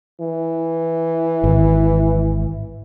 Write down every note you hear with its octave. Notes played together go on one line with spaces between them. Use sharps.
E3
G#1